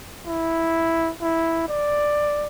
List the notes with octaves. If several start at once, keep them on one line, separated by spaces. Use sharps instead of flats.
E4
E4
D5